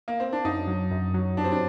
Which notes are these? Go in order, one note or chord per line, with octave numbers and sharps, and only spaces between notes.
A#3
C4
D4
F#2 D#4
F#3
F#2
F#3
G2 D4
C4
D4